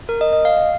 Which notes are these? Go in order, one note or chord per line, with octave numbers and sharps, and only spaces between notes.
A#4
D#5
D#5
F5